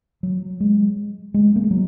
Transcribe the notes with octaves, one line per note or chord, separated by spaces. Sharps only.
F#3
G#3
G#3
A#3
G#3
F#3